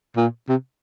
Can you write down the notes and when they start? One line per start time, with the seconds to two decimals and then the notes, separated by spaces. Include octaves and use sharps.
0.16 A#2
0.49 C3